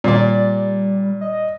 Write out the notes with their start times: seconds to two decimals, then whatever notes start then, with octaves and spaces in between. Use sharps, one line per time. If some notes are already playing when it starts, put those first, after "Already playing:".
0.04 A#2 G3 D5
1.21 D#5